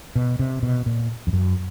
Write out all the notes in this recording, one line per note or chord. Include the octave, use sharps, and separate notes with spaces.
B2
C3
B2
A#2
F2
F#2